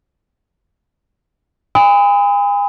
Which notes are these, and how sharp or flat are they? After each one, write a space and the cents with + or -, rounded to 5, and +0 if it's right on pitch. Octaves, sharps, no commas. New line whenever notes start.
G#5 -40 B5 +35 D#6 +35